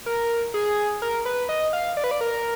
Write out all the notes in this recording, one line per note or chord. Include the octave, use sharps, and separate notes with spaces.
A#4
G#4
A#4
B4
D#5
F5
D5
B4
D5
A#4